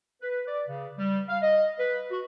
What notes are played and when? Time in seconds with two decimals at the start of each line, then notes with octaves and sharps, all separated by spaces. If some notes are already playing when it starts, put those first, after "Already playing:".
0.22 B4
0.46 D5
0.68 C#3
0.98 G3
1.29 F5
1.42 D#5
1.79 B4
2.11 F#4